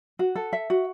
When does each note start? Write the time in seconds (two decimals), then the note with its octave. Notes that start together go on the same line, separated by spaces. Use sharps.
0.19 F#4
0.36 A4
0.53 E5
0.70 F#4